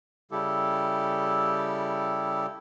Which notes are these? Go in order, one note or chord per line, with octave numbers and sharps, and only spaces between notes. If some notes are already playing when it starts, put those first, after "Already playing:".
C#3 G3 E4 G4 A4